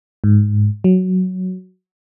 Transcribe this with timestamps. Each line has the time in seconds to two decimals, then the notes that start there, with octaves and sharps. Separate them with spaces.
0.24 G#2
0.84 F#3